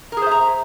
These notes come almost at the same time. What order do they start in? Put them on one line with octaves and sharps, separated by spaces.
A#4 G#4 C5 E5 A#5